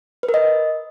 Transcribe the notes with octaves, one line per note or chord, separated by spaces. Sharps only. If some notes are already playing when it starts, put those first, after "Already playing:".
B4
A#4
D#5